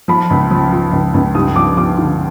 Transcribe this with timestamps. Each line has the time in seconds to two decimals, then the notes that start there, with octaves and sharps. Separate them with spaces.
0.08 F3 B5
0.30 C#2
0.51 F3
0.73 F3
0.93 C#2
1.14 C#2
1.35 G2 D#6
1.56 F3 D6
1.77 F3 D6
1.98 D3